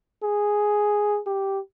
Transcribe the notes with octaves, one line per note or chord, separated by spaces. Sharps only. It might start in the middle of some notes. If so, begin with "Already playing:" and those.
G#4
G4